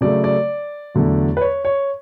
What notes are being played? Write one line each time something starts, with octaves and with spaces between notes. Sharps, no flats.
C#3 F#3 A3 D5
D5
E2 D3 F#3 A3
B4
C#5
C#5